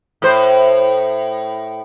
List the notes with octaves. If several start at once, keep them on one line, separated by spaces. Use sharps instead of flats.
A2 C5